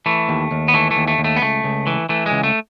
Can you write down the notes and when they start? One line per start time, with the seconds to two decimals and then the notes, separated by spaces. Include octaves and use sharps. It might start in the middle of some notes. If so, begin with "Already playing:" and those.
0.06 E3 A3
0.29 D#2
0.51 D#2
0.68 B3
0.74 E3 A3
0.91 A3
0.97 D#2
1.08 A3
1.18 D#2
1.24 A3
1.36 B3
1.42 C#2 A3
1.64 C#2
1.87 E3
2.09 E3 A3
2.26 G#3
2.31 C#2
2.43 A3